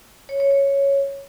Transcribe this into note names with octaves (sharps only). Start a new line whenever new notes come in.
C#5
C#5
C#5